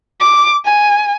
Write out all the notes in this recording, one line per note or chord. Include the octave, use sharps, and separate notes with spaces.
D6
G#5